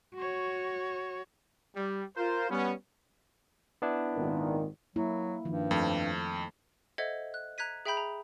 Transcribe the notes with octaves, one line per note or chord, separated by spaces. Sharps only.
F#4 C#5
G3
F4 A#4 C5
G3 B3 C#4
B3 D4 E4
G#1 A#2 D#3
F#3 A#3 E4
G2 D#3 F3
F2 A3 A4
A4 C5 D#5 E5 F#5 G#6
F#6
A#5 F#6 G#6 B6 D#7
G#4 E5 G5 A#5 B5 G6
A#5